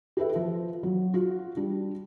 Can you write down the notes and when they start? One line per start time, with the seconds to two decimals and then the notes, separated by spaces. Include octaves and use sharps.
0.17 G4 A4 B4 E5
0.35 F3
0.83 F#3
1.14 F4 F#4
1.57 G3 D4